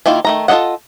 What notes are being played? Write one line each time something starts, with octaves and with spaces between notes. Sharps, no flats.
D#3 A#3 E4 F4
D#3 A3 A#5
F4 A4 D5 D#5 F#5